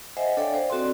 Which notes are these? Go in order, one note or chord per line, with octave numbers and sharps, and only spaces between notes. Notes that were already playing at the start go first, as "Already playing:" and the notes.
C5 D#5 E5 F#5 G#5
D4 A4 C#5 D5 F5 G5
C5
C4 F#4 A4 D5 C6